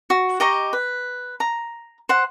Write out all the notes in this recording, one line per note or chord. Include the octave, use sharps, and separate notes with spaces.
F#4
G4 D#5 A#5 C#6
B4
A#5
C5 F#5